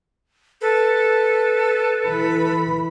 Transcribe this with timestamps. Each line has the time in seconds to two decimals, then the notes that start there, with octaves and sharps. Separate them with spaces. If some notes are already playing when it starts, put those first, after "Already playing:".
0.61 A4 B4
2.07 E3 B5